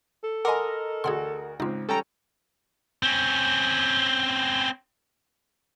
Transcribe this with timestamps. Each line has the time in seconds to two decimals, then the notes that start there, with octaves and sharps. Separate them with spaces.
0.24 A4
0.45 A#4 D#5 F#5 G#5 B5 C6 D6
1.04 D2 F#4 G#4 F#5 C6
1.60 C#2 G#2 C4 D#4 F4
1.89 G3 C#4 A4 G5 A#5
3.03 C4 C#4